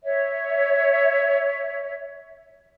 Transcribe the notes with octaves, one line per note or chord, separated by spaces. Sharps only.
C#5 E5